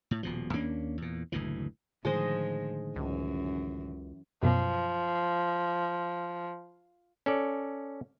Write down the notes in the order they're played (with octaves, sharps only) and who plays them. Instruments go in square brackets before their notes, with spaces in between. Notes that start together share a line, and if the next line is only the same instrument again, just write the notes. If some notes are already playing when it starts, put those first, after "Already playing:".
[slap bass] A2
D#1 B2 F3
D#2 A#3 C#4 D4
E2 A#2
F#1 D2 A2 E3
[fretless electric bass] A2 D3 D#3 [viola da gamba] F3 [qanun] G#3 C5 D#5
[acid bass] C#2 [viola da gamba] F#2 E3
[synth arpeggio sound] F#2 B2 [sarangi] F3
[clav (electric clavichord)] C#4 A4 D5